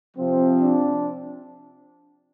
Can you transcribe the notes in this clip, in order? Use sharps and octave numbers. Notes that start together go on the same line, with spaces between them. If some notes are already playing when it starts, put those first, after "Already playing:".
C3 F3 C4
D4